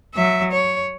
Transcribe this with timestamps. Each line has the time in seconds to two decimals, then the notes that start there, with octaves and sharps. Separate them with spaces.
0.15 F#3 E5
0.52 C#5